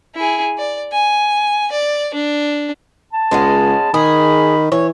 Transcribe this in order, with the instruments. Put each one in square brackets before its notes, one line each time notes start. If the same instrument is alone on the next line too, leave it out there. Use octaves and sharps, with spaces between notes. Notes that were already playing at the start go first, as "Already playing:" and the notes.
[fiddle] E4 G#4
D5
G#5
D5
D4
[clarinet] A5
[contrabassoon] C#2 [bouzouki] G#3 B3 C#4
[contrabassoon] D#3 [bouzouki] G#4 [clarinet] B5
[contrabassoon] E3 [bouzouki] C#5